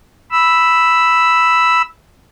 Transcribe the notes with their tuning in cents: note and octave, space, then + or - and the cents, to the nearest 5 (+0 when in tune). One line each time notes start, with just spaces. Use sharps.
B5 +0 E6 +0